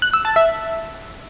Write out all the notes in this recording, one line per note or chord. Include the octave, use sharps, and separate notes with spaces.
F#6
E6
A5
E5